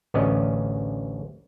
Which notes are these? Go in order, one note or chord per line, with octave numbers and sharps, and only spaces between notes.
A1 D2 B3 C#4 D5 D#5